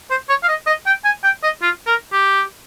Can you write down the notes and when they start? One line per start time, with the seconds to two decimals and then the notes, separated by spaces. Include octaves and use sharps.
0.10 C5
0.29 C#5
0.43 F5
0.49 D#5
0.67 D#5
0.86 G5
1.05 G#5
1.24 G5
1.43 D#5
1.62 F4
1.87 A#4
2.12 G4